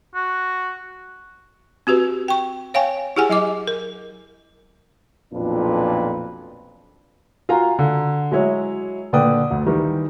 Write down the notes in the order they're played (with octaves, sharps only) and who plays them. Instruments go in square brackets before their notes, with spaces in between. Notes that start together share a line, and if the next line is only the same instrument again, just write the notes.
[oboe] F#4
[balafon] C4 F#4 G4 B4
G5 C#6
C#5 F5 G5 G#5 C#6
E4 G4 G#4 F#5 G#5
F#3 E4 D#5 D6
A#4
[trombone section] B1 F2 A#2 D4 F4 B4
[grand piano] F4 F#4 F5 G#5 A#5
D3
F#3 G#3 E4 C#5
A#2 D3 B4 D5 G5 D#6
D2
D#3 E3 G3